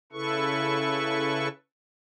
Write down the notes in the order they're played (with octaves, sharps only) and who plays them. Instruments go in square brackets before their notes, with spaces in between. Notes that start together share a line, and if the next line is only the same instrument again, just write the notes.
[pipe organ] C#3 E4 A4 B4 C#6